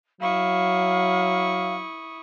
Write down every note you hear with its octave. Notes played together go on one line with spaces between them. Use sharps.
F#3 E4 F5 C#6 D#6